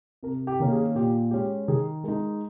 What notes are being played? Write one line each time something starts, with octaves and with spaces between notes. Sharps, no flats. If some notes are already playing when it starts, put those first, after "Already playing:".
C3 A#4
G4
D#3 A#3 C#4
G#4
A#2 G4
G#3 C#4 G4
D#3 G#4
G#3 D#4 A#4